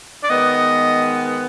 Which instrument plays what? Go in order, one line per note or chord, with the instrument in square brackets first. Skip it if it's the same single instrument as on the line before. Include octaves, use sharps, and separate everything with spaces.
[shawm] D5
[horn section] D#3 G#3 B3 [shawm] D#5